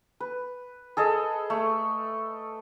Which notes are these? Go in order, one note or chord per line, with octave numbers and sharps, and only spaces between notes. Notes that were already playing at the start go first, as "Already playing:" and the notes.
B4
G#4 A4 D#5
A3